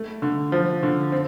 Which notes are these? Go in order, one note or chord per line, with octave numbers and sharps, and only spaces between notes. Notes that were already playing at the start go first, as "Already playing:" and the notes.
Already playing: A3
D3
F3
D3
C4